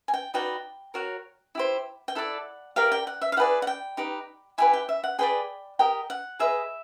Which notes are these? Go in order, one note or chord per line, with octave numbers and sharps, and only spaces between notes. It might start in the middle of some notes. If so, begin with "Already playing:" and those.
G#5
G5
D#4 F#4 B4 D5 G5
F#4 A#4 C#5
E4 G4 C5
G5
E4 A4 D5 F#5
G4 A#4 D5 F5
G5
F#5
E5
F5
E4 G#4 B4 D5 F#5
F#5
G5
D#4 G4 B4
E4 G4 B4 G#5
G5
E5
F#5
G#4 B4 D5 G5
G4 A#4 D#5 G5
F#5
G#4 B4 D#5 E5